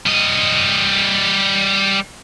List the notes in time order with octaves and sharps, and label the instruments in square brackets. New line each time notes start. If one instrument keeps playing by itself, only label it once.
[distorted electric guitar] G3 D#5